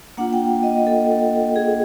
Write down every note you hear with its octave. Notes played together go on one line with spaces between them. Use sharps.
A#3 D4 F4 F#5
G5
D#5
A4
G#4